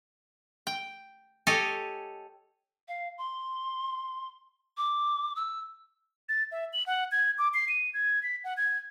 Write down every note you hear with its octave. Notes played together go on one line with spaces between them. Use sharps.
G5
G4 A4 C#5 D#5 G#5
F5
C6
D6
E6
A6
E5
F#7
F#5
G#6
D6
C7
D#7
G#6
B6
F#5
G#6